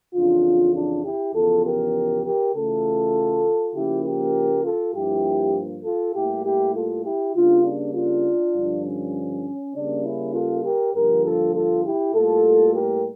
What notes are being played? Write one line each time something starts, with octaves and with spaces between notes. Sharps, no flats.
F2 C#3 E3 D4 F4
D4 F4
E4 G4
E2 C#3 F3 F4 A4
G4 A#4
G4 A#4
C#3 E3 A3 F4 A4
C#3 F3 A#3 E4 G4
G4 A#4
F4 A4
G2 F3 A#3 E4 G4
F4 A4
A2 G3 A#3 E4 G4
E4 G4
F4 A4
E4 G4
C#3 G3 A#3 D4 F4
D4
D4 F4
G2 D3 F3
C#4
C#3 G3 A#3 D4
C#4 E4
F4 A4
G4 A#4
G2 D3 F3 A#3 G4 A#4
F4 A4
F4 A4
E4 G4
A2 G3 A#3 F4 A4
G4 A#4